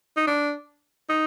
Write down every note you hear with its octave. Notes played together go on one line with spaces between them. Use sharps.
D#4
D4
D#4